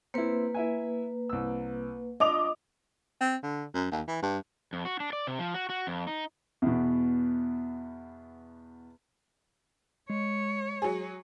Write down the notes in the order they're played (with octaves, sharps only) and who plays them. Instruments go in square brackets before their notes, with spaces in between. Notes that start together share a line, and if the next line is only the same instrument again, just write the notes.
[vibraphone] A#3 B4 [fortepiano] C4 E4
[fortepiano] E4 E5 G#5
C2 E6
[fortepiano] D4 F4 [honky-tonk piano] D#5 D6 F7 [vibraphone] D#6
[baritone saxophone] C4
D3
F#2
D#2
E3
G2
[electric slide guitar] F2
F#4
D4
D5
C3
F3
F#4
F#4
F2
D#4
[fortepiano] E2 B2
[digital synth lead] G#3 [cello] C#5
[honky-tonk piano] F#3 G#4